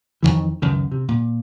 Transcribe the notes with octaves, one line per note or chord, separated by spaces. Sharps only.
F2 C3 D#3 E3
C#2 F#2 D#3
C3
A#2